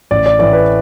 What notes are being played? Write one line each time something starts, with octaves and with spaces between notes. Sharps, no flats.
A1 D5
D5
A2 E3 D5
B4